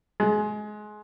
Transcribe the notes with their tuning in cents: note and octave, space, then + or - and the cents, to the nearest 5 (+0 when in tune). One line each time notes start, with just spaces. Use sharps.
G#3 +25